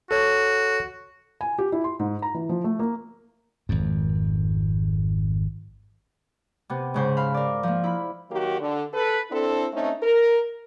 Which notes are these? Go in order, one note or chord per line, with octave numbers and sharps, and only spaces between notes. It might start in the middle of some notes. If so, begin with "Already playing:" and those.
F#4 A4 C#5
G#5
G4
E4
C6
G#2
A#5
E3
F3
A3
A#3
G#1 F2
C3 B3
G#2 C#3 C5
F5 B5
A#4 D5
F3 A#3
E4 B5
D#3 F#3 A#3 F#4 G4
D3
A4 B4
C4 D4 E4 A4
A3 C4 C#4 D#4
A#4